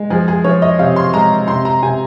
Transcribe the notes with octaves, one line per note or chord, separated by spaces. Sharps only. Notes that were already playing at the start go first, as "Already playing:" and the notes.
Already playing: G#3
F3 G#4
G#4
F3 C#5
D#5
C3 F5
C6
G#3 A#5
C3 C6
A#5
C3 G#5